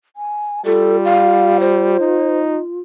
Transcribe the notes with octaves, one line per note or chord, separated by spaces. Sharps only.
G#5
G3 F4 A4
F5
C5
D#4